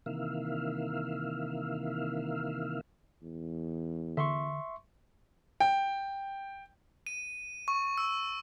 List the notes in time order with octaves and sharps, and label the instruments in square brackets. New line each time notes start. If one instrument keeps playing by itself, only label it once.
[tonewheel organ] C3 D#3 E3 A#3 E5 F5
[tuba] E2
[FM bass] D3 [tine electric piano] E5 C6 C#6
[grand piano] G5
[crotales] D#7
C#6
E6